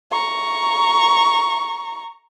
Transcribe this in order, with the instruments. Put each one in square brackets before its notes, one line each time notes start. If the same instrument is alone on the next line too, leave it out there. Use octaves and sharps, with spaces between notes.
[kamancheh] A#5 C#6